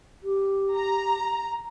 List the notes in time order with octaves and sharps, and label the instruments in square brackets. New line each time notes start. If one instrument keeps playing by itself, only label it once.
[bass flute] G4
[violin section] A#5